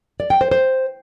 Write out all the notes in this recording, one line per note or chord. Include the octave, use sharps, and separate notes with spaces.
D5
G5
C5
C5